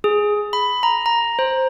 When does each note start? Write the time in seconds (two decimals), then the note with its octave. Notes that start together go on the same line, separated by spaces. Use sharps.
0.04 G#4
0.53 B5
0.83 A#5
1.06 A#5
1.39 C5